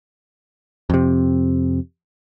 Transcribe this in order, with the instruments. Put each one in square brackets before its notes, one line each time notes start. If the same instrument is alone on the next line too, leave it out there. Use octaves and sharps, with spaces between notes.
[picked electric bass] F2 C3